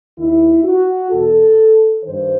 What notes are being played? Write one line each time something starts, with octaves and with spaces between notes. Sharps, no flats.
D#2 D#3 E4
F#4
E2 B2 A4
G2 D#3 C5